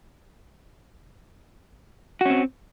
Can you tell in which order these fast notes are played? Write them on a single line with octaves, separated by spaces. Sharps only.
F#4 C#4 C4